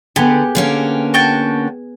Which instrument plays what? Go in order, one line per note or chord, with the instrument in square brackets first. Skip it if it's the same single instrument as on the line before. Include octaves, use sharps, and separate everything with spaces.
[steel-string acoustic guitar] D3 [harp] B3 G#4 [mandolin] G4
[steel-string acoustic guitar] D3 A#3 C#4
[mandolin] F#4 G5 A5